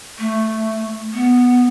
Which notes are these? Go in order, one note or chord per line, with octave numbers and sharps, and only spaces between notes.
A3
B3